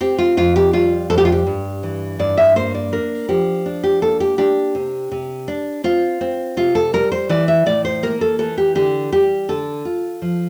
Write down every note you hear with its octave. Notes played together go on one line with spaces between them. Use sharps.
C4 G4
F4
F2 F4
G4
G3 F4
F2 A4
G4
F4
G4
G2
E3
G2 D5
E5
A#3 C5
D5
D4 A#4
F3 G4
D4
G4
A#3 A4
G4
D4 G4
C3
C3
D4
C4 F4
C4
C3 F4
A4
G3 A#4
C5
E3 D5
E5
A2 D5
C5
A#3 A#4
A4
E3 A4
G4
D3 G4
G3 G4
D3 A4
F4
F3